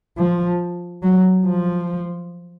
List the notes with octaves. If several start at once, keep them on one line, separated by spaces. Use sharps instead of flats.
F3
F#3
F3